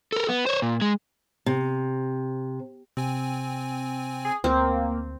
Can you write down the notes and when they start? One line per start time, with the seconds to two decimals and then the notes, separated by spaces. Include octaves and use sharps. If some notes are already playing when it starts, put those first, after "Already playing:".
0.12 A4 A#4
0.29 B3
0.47 C5 C#5
0.62 A#2
0.81 G#3
1.46 C3
2.97 C3 C4 G#5
4.25 G#4
4.44 D2 A#3 C4